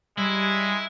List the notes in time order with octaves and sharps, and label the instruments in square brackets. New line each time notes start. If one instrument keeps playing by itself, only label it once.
[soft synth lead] G3 [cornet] G#3 [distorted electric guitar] E4